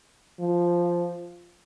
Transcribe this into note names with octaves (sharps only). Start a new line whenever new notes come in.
F3